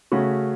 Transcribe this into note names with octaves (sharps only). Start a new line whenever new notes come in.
C#3 A3 C#4 F#4